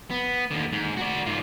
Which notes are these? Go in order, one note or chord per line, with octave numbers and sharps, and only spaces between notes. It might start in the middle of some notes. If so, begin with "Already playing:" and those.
B3
D#2 D3
G#2
F#4 D5
G#2 F4